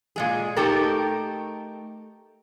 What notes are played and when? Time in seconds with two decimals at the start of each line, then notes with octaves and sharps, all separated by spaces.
0.16 A#2 G#3 G#4
0.56 A3 D#4 G4 A4 A#4